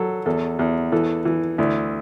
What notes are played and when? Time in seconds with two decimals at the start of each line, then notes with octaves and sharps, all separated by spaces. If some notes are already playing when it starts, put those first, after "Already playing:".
Already playing: F#3 A4
0.26 E2 A4
0.59 E2
0.92 E3 A4
1.25 E3
1.58 D2 E4